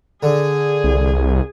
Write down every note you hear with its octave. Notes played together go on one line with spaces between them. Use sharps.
D3 G#4
C2